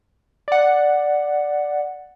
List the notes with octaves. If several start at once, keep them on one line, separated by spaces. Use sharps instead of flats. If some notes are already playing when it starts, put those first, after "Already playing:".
D5 F#5